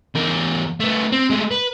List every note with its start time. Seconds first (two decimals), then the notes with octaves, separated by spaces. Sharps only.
0.15 E2 A#4
0.80 A3 B3
1.12 C4
1.30 G#3 A3
1.51 B4